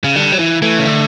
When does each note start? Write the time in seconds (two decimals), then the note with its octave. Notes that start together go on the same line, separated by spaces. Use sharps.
0.04 C#3
0.16 D3 G3
0.32 F#3
0.39 E3
0.62 E3 A3
0.78 C#3
0.85 D3